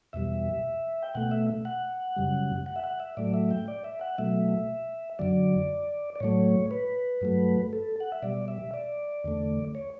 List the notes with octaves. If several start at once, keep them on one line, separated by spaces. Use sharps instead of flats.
E2 B2 G3 E5
G5
B2 A3 F#5
E5
F#5
F#2 C#3 G3
F#5
E5
F#5
E5
A2 F#3 A3 D5
E5
G5
D5
E5
F#5
B2 F#3 A3 E5
F#2 D3 F#3 D5
D5
A2 F#3 A3 C#5
B4
G2 F#3 A3
A4
F#5
E5
B2 G3 D5
E5
D5
E2 D3 A3
C#5